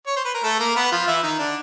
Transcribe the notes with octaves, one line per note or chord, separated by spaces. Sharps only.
C#5
C5
B4
A#4
A3 A4
A#3 A#4
B3 B4
F3 F4
E3 E4
D#3 D#4
D3 D4